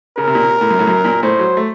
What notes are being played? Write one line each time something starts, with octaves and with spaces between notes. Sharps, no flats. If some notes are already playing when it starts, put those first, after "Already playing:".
C#3 A#4
C3
A#2
C3
A2
F#2
A2
F#2
A#2
A2 C5
F#3
A3